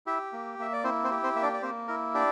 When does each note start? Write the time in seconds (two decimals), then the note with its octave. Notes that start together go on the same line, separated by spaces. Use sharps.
0.07 E4 G4 E5
0.33 A#3
0.59 A#3 E5
0.73 D5
0.84 C4 E4 C5
1.04 C4 C5
1.11 G4
1.24 C4 C5
1.36 A#3 E5
1.42 D4 D5
1.54 D5
1.62 A#3 C4 C5
1.88 E4 A#4
2.15 D4 G4 D5